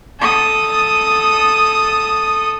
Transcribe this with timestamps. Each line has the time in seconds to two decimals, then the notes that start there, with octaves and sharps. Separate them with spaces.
0.20 A4 D#6